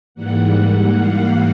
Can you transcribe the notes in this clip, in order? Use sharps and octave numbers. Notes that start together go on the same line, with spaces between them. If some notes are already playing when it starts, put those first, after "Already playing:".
G#2 E3 G3 A#3 F#5
F5